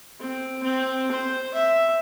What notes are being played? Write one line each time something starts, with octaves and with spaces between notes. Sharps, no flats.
C4
C4
C5
E5